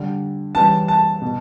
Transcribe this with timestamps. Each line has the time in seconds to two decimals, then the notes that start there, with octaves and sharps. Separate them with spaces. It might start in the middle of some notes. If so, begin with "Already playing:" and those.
Already playing: D3 G3
0.55 C#3 E3 G3 A5
0.88 A5
1.22 B2